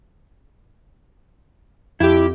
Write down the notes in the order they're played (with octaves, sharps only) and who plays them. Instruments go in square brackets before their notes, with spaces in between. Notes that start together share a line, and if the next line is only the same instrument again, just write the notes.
[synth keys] F2 G4 [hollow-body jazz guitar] E4